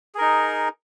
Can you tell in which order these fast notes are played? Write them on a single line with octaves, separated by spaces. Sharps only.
G#4 A#4 D#4